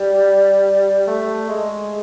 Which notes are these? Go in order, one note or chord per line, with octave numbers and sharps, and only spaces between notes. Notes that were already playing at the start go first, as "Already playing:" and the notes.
Already playing: G3
A3
G#3